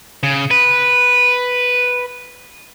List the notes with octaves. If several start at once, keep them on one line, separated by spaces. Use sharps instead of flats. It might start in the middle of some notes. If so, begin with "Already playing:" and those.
C#3
B4